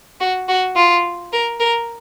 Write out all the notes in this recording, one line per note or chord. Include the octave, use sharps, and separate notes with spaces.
F#4
F#4
F4
A#4
A#4